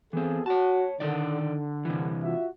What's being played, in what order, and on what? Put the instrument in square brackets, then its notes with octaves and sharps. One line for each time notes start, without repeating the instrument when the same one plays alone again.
[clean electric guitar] E3 C4 [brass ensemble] B3 G#4 A4
[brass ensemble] F#4 [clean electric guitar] C#5 A5
[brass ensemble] D3 [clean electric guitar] D#3 D#4 D5
[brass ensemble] D3
[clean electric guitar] C3 E3
[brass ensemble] F4 F#4 E5